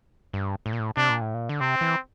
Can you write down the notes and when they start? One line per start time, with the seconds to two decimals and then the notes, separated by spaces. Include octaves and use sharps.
0.33 G2
0.66 A2
0.73 A#2
0.79 A2
0.97 C3 D4
1.10 A#2
1.21 A2
1.34 A#2
1.49 D3
1.60 C3 C4
1.81 E3